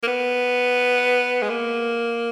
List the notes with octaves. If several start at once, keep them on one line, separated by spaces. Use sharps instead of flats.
A#3
B3
G#3
A#3